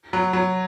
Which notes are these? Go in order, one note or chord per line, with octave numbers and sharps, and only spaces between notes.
F#3
F#3